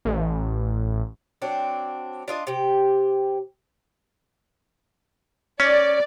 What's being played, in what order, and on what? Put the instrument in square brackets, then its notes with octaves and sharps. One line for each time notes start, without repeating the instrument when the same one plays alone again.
[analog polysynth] A1
[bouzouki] F#3 C4 D4
D4 F4 D#5
C3 G4
[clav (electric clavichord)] C#4 [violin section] D5